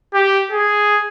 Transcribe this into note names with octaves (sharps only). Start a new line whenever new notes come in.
G4
G#4